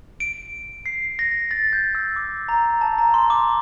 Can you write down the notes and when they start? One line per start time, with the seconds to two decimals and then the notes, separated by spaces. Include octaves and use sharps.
0.20 D7
0.86 C7
1.19 A#6
1.51 A6
1.73 G6
1.95 E6
2.16 D6
2.49 A#5
2.81 A5
2.98 A#5
3.14 C6
3.30 D6